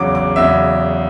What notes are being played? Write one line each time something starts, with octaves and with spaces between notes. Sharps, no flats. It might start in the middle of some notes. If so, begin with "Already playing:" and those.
Already playing: E2 C#3 F#3 D6
D6
E2 C#3 F#3 E5